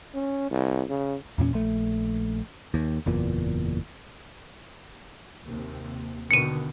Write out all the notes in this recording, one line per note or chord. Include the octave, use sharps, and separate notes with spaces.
C#4
C2
C#3
E2 A#2 C4 C#4
A#1 A3
D#2
F#1 E2 A#2
D#2 C3
B2 D3 D#3 C#7 D#7